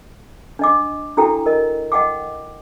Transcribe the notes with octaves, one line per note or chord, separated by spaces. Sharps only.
D4 D#5 D6
D4 E4 F#4 A4 G5 A#5
A#4 D#5
D#5 F#5 G5 D6